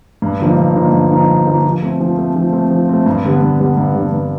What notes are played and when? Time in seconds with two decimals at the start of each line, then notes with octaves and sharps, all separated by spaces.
0.22 G2
0.40 D3 F3 A#3 D#4
0.57 G2
0.76 D3 F3 A#3 D#4
0.93 G2
1.11 D3 F3 A#3 D#4
1.29 G2
1.46 D3 F3 A#3 D#4
1.65 F3
1.82 A3 C4
2.00 F3
2.17 A3 C4
2.36 F3
2.53 A3 C4
2.70 F3
2.89 A3 C4
3.06 G2
3.24 D3 G3 B3
3.42 G2
3.60 D3 G3 B3
3.77 G2
3.95 D3 G3 B3
4.13 G2